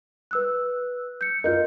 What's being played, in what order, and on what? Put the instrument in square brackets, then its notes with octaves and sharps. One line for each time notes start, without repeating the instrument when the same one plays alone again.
[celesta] B4 E6 F#6
G6 C#7
[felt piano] F4 A#4 [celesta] D#5 G6